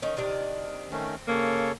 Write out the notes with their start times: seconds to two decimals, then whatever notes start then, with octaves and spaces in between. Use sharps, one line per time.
0.02 D#3 C#4
0.17 C3 D#3 D4
0.92 D#3 A3 C4 C#4
1.28 C#3 A#3 A4 C#5